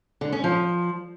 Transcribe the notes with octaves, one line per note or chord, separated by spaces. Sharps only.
D3
C#4
F3